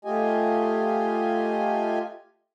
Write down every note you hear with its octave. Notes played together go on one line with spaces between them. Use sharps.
A3 F4 G4 D#5 G#5